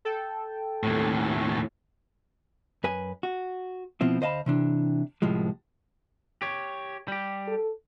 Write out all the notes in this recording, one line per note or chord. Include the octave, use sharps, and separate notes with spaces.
A4 G5
D#2 A2
A3
F#2 B4 G#5
F#4
B2 F3 C4 E4
D2 C5 D#5 F5 A5 B5
C3 E3 D4
C2 A2 F3 G#3
G4 C#5
G3 G4
A4